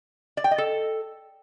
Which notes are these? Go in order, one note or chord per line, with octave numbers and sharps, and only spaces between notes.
D5
G5
D#5
A4